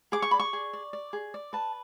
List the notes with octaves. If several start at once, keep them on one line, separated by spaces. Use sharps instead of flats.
G#4 D6
C#6
D5 B5
C#6
G#4
D5
D5
G#4
D5
B4 A5